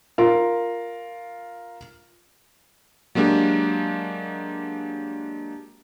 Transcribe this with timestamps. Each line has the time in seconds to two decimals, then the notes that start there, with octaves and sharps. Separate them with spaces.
0.18 F4 A#4
3.15 F#3 G#3 A#3 D4 G4